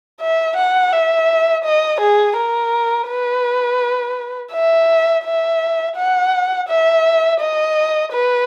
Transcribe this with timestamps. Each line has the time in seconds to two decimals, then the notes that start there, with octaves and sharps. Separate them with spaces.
0.20 E5
0.57 F#5
0.92 E5
1.64 D#5
2.00 G#4
2.36 A#4
3.08 B4
4.52 E5
5.24 E5
5.96 F#5
6.68 E5
7.40 D#5
8.12 B4